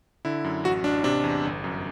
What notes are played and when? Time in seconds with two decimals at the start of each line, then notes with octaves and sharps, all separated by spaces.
0.25 D3 E4
0.44 F#2
0.64 A1 F#4
0.84 A1 D4
1.04 C3 D4
1.24 E2
1.45 G1
1.64 F#2